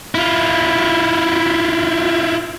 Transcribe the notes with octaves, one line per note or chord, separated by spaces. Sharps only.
E4 F4